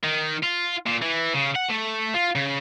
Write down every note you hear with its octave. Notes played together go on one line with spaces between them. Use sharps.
D#3
F4
A#2
E3
C#3
F#5
A3
F4
C#3